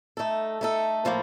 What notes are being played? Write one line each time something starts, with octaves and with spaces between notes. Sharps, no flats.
A3 D#4 A4
A3 D#4 A4
A2 F3 A#3